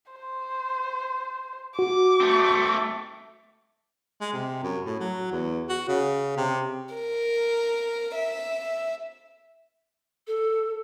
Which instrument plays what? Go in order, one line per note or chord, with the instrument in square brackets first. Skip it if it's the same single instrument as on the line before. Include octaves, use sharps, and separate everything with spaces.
[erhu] C5
[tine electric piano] F#4 [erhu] D6
[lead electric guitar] A3 C4
[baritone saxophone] G#3
C3
F#2
A2
F#3
E2
F#4
C#3
C3
[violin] A#4
E5
[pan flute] A4